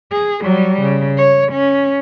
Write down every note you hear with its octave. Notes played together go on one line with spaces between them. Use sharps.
G#4
F#3 G3
C#3
C#5
C#4